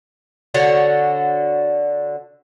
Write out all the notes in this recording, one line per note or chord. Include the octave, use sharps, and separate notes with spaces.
D3 F#4 C#5